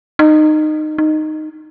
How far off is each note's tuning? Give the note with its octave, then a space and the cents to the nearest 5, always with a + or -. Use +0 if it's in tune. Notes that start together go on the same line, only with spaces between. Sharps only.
D#4 -20
D#4 -10